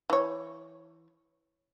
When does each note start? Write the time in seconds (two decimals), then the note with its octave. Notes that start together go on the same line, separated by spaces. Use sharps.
0.10 E3 C#5